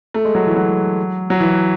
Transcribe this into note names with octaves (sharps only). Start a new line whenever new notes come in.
A3
G#3
F#3
E3
F#3
F#3
E3